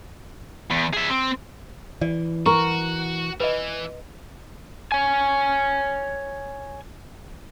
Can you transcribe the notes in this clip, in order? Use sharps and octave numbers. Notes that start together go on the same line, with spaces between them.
E2
G#4 E5
C4
E3 D5
F#4 A#4 C#6
E3 B4 D#5
C#5 G#5